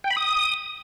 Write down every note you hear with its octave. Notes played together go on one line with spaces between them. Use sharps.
G5
B5
D#6